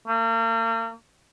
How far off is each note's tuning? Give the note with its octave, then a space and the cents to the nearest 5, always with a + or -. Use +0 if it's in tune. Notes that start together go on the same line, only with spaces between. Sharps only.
A#3 -40